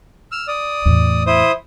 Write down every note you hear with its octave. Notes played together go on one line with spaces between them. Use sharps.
E6 F6
D5 D#6
E2 A2
E4 C5 D#6